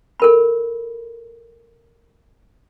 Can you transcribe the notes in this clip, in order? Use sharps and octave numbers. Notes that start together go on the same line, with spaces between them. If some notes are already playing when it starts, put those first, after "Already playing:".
A4 A#4 B5